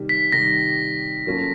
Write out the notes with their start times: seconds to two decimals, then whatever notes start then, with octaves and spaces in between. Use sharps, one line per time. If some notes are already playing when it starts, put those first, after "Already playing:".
Already playing: C3 D#3 G3
0.09 B6
0.32 C3 D#3 G3 A#6
1.26 F#3 A#3 C#4 F4 A4